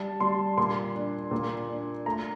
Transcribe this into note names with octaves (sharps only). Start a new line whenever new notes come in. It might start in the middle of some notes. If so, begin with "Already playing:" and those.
Already playing: G3 A5
G3 C6
A#2 C6
D4
A#2
D4
A3 A#5